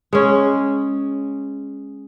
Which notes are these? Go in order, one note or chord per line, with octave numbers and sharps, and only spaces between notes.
G#3 C#4